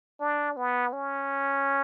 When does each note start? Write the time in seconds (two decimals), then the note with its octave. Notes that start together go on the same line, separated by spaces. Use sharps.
0.21 D4
0.57 B3
0.93 C#4